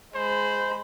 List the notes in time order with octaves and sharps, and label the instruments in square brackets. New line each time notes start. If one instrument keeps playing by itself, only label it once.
[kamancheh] G#3 B5 [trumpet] C5